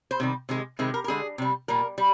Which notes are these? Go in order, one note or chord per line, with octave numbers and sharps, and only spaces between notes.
C5
C3 D#3 G3
C3 D#3 G#3
C3 D#3 G#3
A#4
A#4
D3 G#3 G#4
C3 G3
A#2 G3 A#4
G3